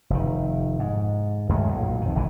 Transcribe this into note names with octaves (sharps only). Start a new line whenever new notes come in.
F1 D#3
G#2
F#2 A2 D#3 G#3
B1 A#2
F2 D#3
G#1 G#2 D3 E3